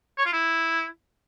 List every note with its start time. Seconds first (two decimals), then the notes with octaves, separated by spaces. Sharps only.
0.18 C#5
0.25 F4
0.33 E4